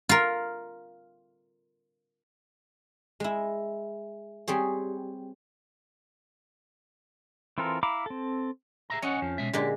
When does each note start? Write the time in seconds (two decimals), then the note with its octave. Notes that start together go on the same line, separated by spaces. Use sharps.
0.09 F4 A#4
3.20 G#3 E4
4.48 G3 C4 G#4 C#5
7.58 E3 C4 F4 A4 A#4
7.83 E4 F5 A#5 B5 D6
8.06 C4 A4
8.90 G#4 E5 A#5
9.02 C#4 C#5 D#5 F#5
9.22 F2 F3
9.38 B2 G#3 E5
9.53 A#2 D3 G#3 G4